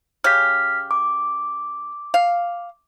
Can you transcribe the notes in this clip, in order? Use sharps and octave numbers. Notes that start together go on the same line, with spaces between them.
C#3 C#4 G4 F6 B6
D6
F5